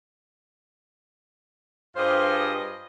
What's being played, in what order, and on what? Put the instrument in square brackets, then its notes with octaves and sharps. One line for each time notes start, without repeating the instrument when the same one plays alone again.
[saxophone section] G2 F4 G4 G#4 C5 D#5